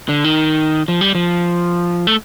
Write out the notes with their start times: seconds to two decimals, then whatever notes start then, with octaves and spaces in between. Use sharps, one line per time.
0.09 D3
0.24 D#3
0.88 F3
1.01 G3
1.15 F3
2.07 A3